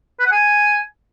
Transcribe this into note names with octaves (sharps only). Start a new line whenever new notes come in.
B4
F#5
G#5